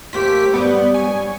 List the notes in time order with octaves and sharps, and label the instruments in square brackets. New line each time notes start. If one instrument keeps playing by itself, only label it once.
[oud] F#2 A#3 C5 [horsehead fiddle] A3 G4 [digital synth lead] B6
[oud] G2 F#3 G3 [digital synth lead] B3
[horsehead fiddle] C#5 [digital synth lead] G#5